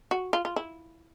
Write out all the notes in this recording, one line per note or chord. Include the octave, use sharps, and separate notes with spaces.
F#4
F4
F4
E4